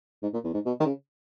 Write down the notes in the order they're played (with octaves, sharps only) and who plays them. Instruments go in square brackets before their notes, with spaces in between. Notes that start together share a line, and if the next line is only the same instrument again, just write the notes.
[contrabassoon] G#2
A#2
E2
G#2
B2
D#3
C#3